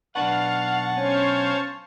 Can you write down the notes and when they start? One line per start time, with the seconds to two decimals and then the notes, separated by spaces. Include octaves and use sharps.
0.15 B1 D4 B4 F5 F#5 A5 C#6
0.97 C#4 C5 C#5 F5